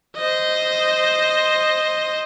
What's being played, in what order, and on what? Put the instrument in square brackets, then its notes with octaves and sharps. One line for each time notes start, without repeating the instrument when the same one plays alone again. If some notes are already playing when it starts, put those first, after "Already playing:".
[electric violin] C5 D#5